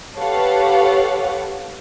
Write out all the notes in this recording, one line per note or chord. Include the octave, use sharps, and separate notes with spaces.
G4 A4 B4 C#5 F5 F#5